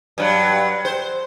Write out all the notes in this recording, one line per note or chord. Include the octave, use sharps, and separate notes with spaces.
G2 F#3
C5